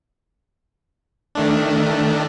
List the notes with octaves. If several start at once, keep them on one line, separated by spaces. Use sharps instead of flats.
D#3 A3 D4